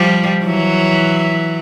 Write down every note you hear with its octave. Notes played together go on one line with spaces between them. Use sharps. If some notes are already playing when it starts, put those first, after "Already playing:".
Already playing: F3 G3
E3 F#3